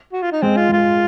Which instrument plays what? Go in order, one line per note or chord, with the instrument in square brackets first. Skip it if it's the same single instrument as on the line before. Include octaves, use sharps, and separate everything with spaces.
[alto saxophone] F#4
F4
D#4
[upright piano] G#3 [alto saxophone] C4
[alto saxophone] F4
[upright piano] G#3 [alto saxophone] F4